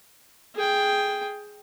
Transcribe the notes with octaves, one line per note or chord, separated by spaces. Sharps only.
G#4 G5